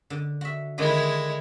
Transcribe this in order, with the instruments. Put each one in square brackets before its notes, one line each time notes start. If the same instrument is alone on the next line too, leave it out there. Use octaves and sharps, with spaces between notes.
[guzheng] D3
F#4 E5
[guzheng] D3 D#3 G4 [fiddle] G#3 E4